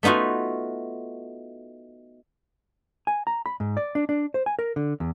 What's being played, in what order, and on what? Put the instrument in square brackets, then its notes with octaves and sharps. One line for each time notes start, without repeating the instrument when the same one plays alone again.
[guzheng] A3 B3 D#4 F4 F#4
[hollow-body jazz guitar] G#5
A#5
B5
G#2
D5
D4
D4
C5
G#5
A#4
D3
E2